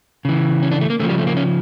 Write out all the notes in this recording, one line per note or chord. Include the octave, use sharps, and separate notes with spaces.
C#3 E3
C#4
D4
A3
A#3
C#3 F3 A3
G3
A3
A#3
C#4